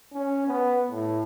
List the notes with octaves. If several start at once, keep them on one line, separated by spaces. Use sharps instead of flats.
C#4
B3
A2